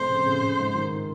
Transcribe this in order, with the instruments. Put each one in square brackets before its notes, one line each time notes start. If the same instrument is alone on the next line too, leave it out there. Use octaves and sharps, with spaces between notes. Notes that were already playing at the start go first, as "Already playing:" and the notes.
Already playing: [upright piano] F1 A3 [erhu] C5
[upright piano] C#3
C#3
C#3
G#2
D#3